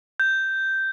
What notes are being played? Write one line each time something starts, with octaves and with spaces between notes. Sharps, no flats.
G6